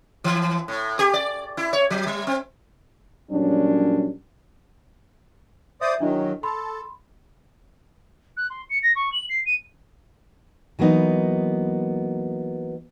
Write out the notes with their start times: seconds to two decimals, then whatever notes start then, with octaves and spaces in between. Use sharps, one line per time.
0.24 E3
0.68 A2
0.99 G4
1.14 D5
1.57 E4
1.73 C#5
1.90 F#3
2.07 G3
2.27 C4
3.30 F2 A#2 F#3 G3 C#4 D4
5.81 C5 D5 E5 D#6
6.00 D#3 F#3 D4 E4 D#5
6.43 A4 B5 C6
8.37 F#6
8.50 C6
8.69 C#7
8.83 A#6
8.95 C#6
9.12 F#7
9.29 C7
9.46 D#7
10.79 E3 F#3 A#3 B3 D#4